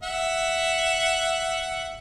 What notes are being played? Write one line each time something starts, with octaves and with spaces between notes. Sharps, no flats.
E5 F#5